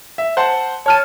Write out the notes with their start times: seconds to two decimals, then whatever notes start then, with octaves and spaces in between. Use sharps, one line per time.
0.18 E5
0.37 C5 F#5 A5
0.86 C#5 A5 F6 D#7